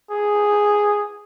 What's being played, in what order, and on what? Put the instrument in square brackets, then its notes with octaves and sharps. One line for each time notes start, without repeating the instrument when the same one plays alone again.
[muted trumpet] G#4